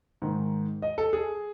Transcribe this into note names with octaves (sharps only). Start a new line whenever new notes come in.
G#2 D#3
D#5
A4
G#4